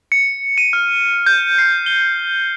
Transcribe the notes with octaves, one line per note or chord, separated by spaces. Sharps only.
C#7
D#7
F6
G6
C7
G7